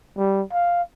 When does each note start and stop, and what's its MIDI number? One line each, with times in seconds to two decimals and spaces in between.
0.17 0.43 55
0.52 0.82 77